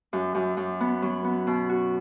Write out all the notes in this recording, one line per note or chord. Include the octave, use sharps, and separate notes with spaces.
F#2
F#2
F#2
B3
F#3
B3
B2
F#4